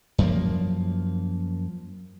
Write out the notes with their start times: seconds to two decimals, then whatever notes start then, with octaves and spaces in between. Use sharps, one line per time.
0.18 F#2 F3 A#3